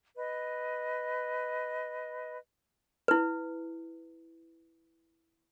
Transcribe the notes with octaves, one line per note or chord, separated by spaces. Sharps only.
B4 D#5
E4 B4